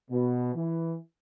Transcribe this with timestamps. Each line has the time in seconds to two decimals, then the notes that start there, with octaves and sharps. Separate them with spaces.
0.11 B2
0.55 E3